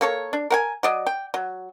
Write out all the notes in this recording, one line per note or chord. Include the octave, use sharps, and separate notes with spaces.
A#3 A4 C#5
D4
A#4 F#5 G#5
F#3 D5 D#5
G5
F#3